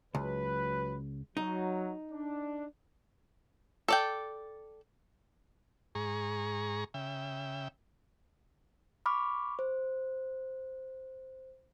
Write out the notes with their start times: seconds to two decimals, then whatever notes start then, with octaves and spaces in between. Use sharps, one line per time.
0.15 C#2 F#3 B4
1.37 F#3 D#4
2.11 D4
3.88 A4 D5 G5
5.95 G#2 G#4 A#5 C#6
6.94 C#3 E5 G5
9.06 B5 C#6 D6 F6
9.59 C5